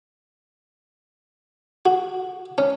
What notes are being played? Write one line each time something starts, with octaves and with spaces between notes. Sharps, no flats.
F#4
C#4